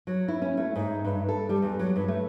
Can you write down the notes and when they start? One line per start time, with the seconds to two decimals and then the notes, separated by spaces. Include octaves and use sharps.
0.07 F#3
0.28 E4
0.42 C#4
0.57 A3
0.76 G#2
1.05 G2
1.29 A4
1.49 G3
1.62 E2
1.79 F#3
1.96 G2
2.08 A3